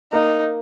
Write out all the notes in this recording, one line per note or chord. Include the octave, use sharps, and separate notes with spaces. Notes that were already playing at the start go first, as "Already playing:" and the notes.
A#3 D#4